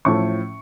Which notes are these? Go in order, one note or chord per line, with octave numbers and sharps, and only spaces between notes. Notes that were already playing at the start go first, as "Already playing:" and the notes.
A1 A2 F3 A3 C#6